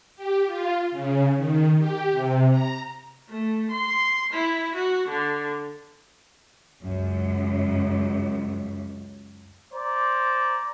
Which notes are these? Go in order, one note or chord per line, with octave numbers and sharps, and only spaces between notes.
G4
F4
C#3
D#3
G4
C3
A#5
A3
C6
E4
F#4
D3
C#2 F#2
C5 D5 A#5